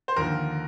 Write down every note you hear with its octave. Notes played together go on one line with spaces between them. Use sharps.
C5
D#2 D3 F3 A#4